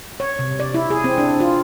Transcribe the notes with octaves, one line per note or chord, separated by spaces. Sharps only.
C#5
C3
D5
E4
G#4
C4
D4
F4